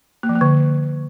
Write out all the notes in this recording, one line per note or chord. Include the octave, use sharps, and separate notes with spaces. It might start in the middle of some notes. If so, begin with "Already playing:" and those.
A#3
F3
A#3
D3